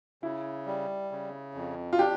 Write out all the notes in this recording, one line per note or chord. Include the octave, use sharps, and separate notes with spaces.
C#3 E4
G3
C#3
F2
F4
D4 G4